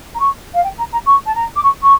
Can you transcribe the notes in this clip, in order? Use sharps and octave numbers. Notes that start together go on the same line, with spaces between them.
A#5
C#6
F5
G5
A#5
A#5
C#6
A5
A#5
D6
C#6
C#6